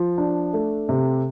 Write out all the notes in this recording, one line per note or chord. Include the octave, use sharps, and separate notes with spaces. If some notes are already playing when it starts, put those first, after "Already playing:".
Already playing: F3
D4
A3
C3